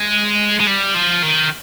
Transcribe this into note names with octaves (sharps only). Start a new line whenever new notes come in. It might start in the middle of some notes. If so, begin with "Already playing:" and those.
Already playing: G#3
G#3
G3
F3
D#3